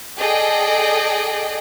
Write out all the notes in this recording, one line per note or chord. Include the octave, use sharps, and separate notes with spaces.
G#4 A4 D5 D#5 G5